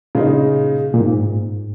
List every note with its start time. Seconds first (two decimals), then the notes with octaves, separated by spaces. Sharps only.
0.15 A#2 C#3 G#3 D#4
0.94 A#2
1.01 G#2